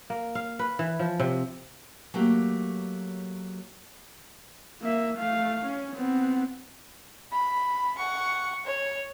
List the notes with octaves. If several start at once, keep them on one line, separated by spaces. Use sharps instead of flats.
A#3
F5
B4
E3
F3
C3
F#3 A3 A#3 F#4 G4
A#3 E5
A3 F5
C#4
B3 C4
B5
F#5 C#6
C#5